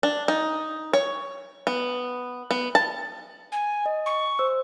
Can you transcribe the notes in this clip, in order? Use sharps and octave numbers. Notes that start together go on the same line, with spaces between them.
D4
D#4
C#5
B3
B3
A5
G#5
D#5
C#6
C5 E6